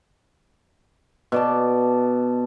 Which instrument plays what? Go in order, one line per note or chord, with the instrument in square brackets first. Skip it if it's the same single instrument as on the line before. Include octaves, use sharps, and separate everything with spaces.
[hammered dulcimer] B2 D5 A5